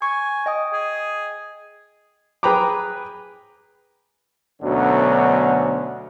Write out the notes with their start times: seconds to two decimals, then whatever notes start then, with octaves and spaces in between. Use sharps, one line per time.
0.02 G#5 C#6
0.46 D#5 G5 D#6
0.74 G#4
2.43 G#4 B4 G5 A#5 B5 D6
4.62 D2 B2 D3 F#3 C#4